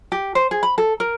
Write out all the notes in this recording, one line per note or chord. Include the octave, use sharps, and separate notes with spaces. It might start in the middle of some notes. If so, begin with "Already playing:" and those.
G4
C5
G#4
B5
A4
A#4